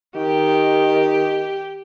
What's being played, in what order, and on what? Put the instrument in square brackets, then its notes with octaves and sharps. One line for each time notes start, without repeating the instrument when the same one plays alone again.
[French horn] D#3 [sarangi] G4